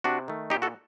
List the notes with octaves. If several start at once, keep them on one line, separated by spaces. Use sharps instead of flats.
C3 D4 F#4
D#3 A3
A#2 D#4 G4
F#4 A4